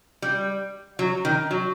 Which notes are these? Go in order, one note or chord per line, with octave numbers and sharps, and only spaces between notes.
G3
F#3
D#3
F#3